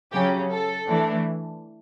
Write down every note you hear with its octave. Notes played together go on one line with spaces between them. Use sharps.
C#3 F#3 C#4 G4
A4
E3 A3 D4